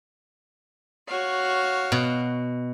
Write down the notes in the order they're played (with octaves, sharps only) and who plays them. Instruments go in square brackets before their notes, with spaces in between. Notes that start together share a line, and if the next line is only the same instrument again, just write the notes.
[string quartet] F#4 C#5 F5
[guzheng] B2